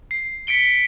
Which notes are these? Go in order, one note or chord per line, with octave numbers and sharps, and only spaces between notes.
C7
B6 C#7 D7 G7